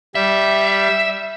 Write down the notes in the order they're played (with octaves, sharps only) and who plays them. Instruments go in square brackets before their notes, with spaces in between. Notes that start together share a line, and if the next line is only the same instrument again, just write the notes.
[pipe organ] G3 [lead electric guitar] E5